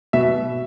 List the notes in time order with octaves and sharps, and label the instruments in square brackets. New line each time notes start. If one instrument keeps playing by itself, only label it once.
[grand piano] B2 E5